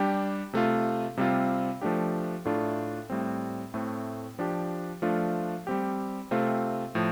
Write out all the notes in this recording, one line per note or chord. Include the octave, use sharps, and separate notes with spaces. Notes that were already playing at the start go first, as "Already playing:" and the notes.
Already playing: G3 D4 G4
C3 A3 F4
C3 G3 C4 F4
F3 A3 D4 G4
A2 A3 D4 F4
A2 G3 C4
A2 A3 C4
F3 D4 G4
F3 A3 D4 F4
G3 C4 G4
C3 A3 C4 F4
A2 F3